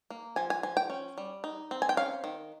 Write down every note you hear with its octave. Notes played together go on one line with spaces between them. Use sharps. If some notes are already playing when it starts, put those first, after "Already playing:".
A#3
F3 G#5
G#5
F3 G#5
G5
C#4
G3
D#4
C4
G#5
G5
C#4 F5
D#3